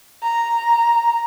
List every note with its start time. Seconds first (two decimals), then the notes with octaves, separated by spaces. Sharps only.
0.23 A#5